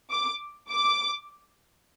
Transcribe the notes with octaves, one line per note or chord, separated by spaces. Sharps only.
D6
D6